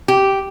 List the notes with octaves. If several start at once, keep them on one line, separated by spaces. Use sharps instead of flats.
G4